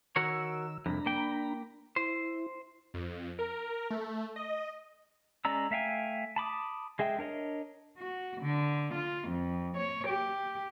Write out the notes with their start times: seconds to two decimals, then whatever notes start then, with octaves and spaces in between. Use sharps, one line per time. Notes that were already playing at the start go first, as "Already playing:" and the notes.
0.16 D#3 F#4 A#4 C#5 E6
0.86 C2 F2 D4 A#5 B5
1.06 A#3 G5
1.96 E4 C5
2.94 F2
3.39 A#4
3.90 A3
4.36 D#5
5.45 G#3 C#4 D5 A#5 E6
5.71 A3 E5 F5 G5 G#5
6.36 A5 B5 D6 D#6
6.99 G#3 G#4 E5 G5
7.19 D4 A#4 C#5 D#5
7.98 F#4
8.41 D3
8.94 F4
9.28 F2
9.77 C#5
10.08 G4